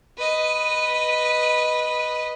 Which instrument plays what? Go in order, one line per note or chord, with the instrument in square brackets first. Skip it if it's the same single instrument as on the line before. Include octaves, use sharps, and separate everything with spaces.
[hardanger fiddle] B4 D#5